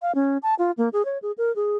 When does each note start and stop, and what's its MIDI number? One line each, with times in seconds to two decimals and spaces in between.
0.02 0.14 77
0.15 0.37 61
0.43 0.55 81
0.59 0.71 65
0.77 0.89 58
0.93 1.05 68
1.05 1.18 73
1.22 1.32 68
1.38 1.54 70
1.56 1.77 68